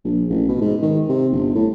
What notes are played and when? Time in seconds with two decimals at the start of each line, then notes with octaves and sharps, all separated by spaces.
0.04 A#1
0.30 A1
0.48 B2
0.61 G#2
0.82 D#3
1.09 C3
1.32 G1
1.55 A2